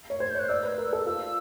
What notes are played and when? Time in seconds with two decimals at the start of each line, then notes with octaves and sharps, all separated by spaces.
0.10 C#5
0.20 C5 G#6
0.30 G6
0.35 C#5
0.39 F#6
0.49 D5 E6
0.63 B4
0.78 A#4
0.93 A4
1.06 F4 E6